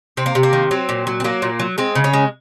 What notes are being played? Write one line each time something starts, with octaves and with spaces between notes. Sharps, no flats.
C3 C4
A#3
C3
A#3
D#3
F#3 C4
A#2
F#3
C4
F#3 A#3
A#2
F#3
G#3 C4
C#3
C#4
G#3